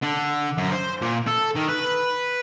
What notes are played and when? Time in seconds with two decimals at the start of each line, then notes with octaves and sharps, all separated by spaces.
0.02 D3
0.58 F#2
0.72 C5
1.02 A#2
1.27 A4
1.55 D#3
1.68 B4